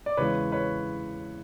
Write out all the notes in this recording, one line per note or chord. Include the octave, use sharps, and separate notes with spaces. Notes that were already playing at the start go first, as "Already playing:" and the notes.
D5
E2 C#3 E3 G#3 B4 C#5
B4 C#5